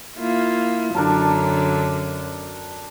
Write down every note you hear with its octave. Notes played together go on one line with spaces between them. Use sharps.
A#3 E4 F4
F#2 D3 F#3 D4 A#4 A5